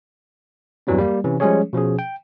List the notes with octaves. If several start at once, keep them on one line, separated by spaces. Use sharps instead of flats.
E2 G2 E3 F#3 G3 C4
G3 A#3
C3 E3 C#4
F3 G3 G#3 C#4 G#4 C#5
B2 F3 C#4 G#4
G5